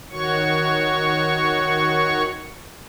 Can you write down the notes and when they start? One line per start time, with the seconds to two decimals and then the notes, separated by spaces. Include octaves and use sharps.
0.11 D#3 F#4 C#5 C#6